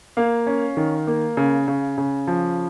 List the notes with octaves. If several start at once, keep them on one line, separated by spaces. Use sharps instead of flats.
A#3 F5
C#4
D#3
A#3
C#3
C#3
C#3
F3